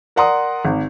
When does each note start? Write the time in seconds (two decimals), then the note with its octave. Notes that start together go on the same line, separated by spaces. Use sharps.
0.16 A#4 D5 F#5 A#5 C6 D#6
0.65 G#1